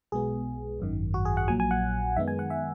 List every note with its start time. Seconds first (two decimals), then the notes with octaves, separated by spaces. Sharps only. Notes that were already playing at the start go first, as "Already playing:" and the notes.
0.12 B1 B2 G#3 B3 G#4
0.80 G#1 F#2 D#3
1.14 F#4
1.25 G#4
1.37 F#5
1.48 A#1 A#2 F#3 G#5
1.60 G#5
1.71 F#5
2.16 F#2 D#3 G#3 B3 E5
2.28 G#5
2.39 F#5
2.50 E5